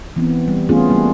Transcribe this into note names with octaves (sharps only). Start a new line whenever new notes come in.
E3 B3 C4
G3
E3 A3 B3 C#4 F4 G#4
G3 A#3